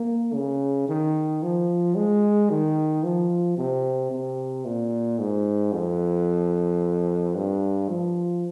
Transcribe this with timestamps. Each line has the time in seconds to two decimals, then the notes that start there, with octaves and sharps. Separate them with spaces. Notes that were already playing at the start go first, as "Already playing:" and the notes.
Already playing: A#3
0.34 C#3
0.89 D#3
1.43 F3
1.95 G#3
2.50 D#3
3.04 F3
3.58 C3
4.11 C3
4.65 A#2
5.19 G#2
5.73 F2
7.36 G2
7.89 F3